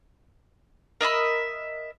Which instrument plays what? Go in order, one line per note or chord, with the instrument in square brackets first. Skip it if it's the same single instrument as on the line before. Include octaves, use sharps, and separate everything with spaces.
[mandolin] A#4 D#5 E5 B5